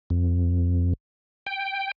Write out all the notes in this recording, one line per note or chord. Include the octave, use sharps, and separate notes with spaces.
F2
G5